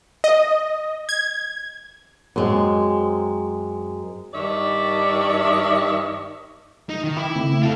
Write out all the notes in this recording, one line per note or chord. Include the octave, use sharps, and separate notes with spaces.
D#5
G#6
F#2 G#3 C4
G2 D#3 C#5 D5 E5
D#4
D#3
E4 G5 B5 D6
C#3 A3 C4
F4 A4